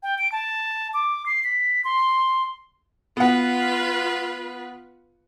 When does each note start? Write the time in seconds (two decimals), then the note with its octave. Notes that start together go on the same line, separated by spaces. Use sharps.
0.03 G5
0.18 D7
0.32 A5
0.94 D6
1.26 C7
1.44 B6
1.84 C6
3.17 B3 F4 B4 F#5